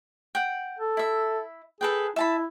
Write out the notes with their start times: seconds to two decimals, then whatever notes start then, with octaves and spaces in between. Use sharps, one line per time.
0.35 F#5 G5
0.79 A4
0.97 E4 E5
1.81 G#4 A4 B4 G5
2.16 E4 E5 A5 B5